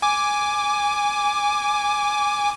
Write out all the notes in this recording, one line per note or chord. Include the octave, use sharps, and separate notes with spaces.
G#5 D6